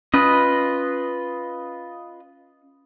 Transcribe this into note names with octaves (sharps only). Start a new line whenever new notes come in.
C#4 F4 B4 D#5